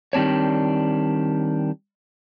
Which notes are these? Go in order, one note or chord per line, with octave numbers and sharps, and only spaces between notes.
D#3 G3 C4 D4 C#5